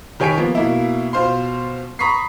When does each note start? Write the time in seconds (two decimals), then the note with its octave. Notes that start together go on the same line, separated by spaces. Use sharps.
0.20 D#3 G4 C#5 G#5 B6 D7
0.37 F3 A#3 B3
0.55 B2 A#3 E4
1.13 B2 F4 C5 F5 C6
1.99 A#5 B5 C#6 D#6 B6 C7